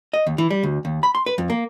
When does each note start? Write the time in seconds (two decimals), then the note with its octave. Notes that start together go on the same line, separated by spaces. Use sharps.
0.13 D#5
0.27 D#2
0.38 E3
0.50 G3
0.63 D2
0.85 D#2
1.03 B5
1.15 C6
1.26 B4
1.38 F2
1.50 A#3